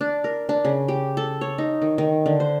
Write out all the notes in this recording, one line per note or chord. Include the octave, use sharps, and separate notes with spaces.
D4
A#4
D4
C#3
G4
A4
C#5
D#4
D#3
D#3
D3
C5